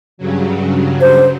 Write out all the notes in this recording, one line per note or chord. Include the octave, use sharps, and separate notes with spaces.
G2 C#3 F#3
C5